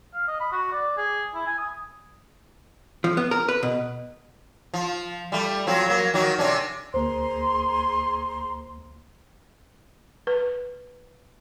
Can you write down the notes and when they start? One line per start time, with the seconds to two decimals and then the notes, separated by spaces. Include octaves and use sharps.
0.14 F5
0.28 D#5
0.40 B5
0.52 F#4
0.72 D5
0.97 G#4
1.34 E4
1.47 G#5
1.58 D#6
3.04 F3
3.17 B3
3.31 A#4
3.48 B4
3.63 B2
4.74 F3
5.32 G3 A3
5.67 F3 F#3 C4
5.86 F#3 A#3
6.14 D#3 F#3 F#4
6.39 C3 C#4 D4
6.94 D2 A#3 G#4 C5 A#5 C6
10.27 B4